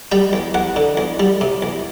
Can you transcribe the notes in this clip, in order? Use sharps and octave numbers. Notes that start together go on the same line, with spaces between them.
G3 G5
E2
E2 F#5
D3
E2
G3
C3
E2